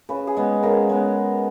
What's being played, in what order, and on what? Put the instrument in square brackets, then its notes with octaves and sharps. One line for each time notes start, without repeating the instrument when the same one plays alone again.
[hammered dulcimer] C#3 [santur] B4
[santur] G#4
[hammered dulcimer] G#3 B3
[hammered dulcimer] C#3 [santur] A#4
[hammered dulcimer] G#3 B3